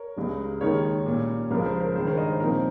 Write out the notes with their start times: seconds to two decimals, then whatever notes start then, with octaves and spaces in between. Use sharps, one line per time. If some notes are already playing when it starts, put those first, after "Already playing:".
Already playing: A#4 C#5
0.16 C#2 C#3 G3
0.61 D#2 D#3 G#3 D#4 A#4 C#5
1.06 A#2 G3 C#4
1.51 C#2 C#3 F3 A#4
1.65 C5
1.81 A#4
1.95 G2 D#3 G#3 D#4 C5
2.07 A#4 C#5
2.17 C5 D#5
2.40 A#2 F3 C4 D#4 A#4